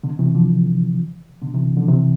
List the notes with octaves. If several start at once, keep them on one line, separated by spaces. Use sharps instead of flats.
B2 D3
C3 E3
D3 F3
B2 D3
C3 E3
D3 F3
C3 E3